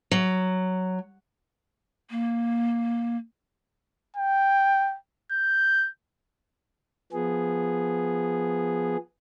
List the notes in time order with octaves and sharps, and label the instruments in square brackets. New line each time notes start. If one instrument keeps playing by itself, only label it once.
[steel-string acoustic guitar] F#3
[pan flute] A#3
[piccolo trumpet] G5
G6
[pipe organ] F3 B3 G#4